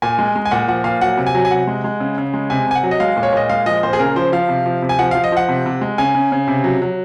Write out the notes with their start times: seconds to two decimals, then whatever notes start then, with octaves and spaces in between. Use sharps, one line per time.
0.02 A#2 G#5
0.19 G#3
0.36 G#3
0.46 G#5
0.51 A#2 F#5
0.68 F3 F#5
0.84 A#2 F5
1.01 F#3 F#5
1.17 C3
1.26 G#5
1.35 F#3
1.45 G#5
1.51 C3 F#5
1.67 G#3
1.84 G#3
2.00 C#3
2.18 C#3
2.34 G#3
2.50 C3 G#5
2.67 C3 G#5
2.75 F#5
2.83 F#3
2.91 D#5
3.00 G#3 F5
3.17 A#2
3.23 C#5
3.33 A#2 D#5
3.49 G#3 F5
3.66 F3 D#5
3.83 A#2 C5
3.93 G#4
3.99 C#3 A#4
4.16 F3 C5
4.32 F3 F5
4.49 C3
4.66 F3
4.82 C3
4.89 G#5
4.99 F3 F#5
5.11 F3 F5
5.24 D#5
5.32 F3 F#5
5.49 C3
5.66 C3
5.81 G#3
5.98 C#3 G#5
6.15 C#3
6.32 C#3
6.47 C3
6.64 F#3
6.82 F#3